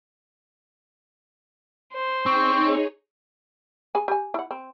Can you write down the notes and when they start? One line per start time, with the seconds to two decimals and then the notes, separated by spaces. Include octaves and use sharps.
1.94 C5
2.26 C4 D#4 G#4 C#5 C#6
3.95 G#4 G#5
4.08 G4 G#5
4.34 E4 F#5
4.51 C4